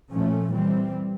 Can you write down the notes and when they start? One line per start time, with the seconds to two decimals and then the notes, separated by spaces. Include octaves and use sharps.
0.10 A#2 F3 A3 C#4
0.51 E3 G3 C4